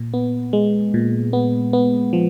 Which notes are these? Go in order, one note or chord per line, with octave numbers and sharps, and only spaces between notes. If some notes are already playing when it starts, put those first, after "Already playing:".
Already playing: A#2
B3
G#3
A#2
B3
B3
F3